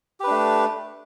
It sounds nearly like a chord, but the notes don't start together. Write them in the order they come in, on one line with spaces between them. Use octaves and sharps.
G4 B4 D4 A3